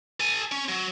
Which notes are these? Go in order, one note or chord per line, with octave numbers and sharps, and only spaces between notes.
A4 G#5
C#4
F#3